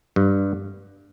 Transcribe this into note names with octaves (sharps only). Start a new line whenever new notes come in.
G2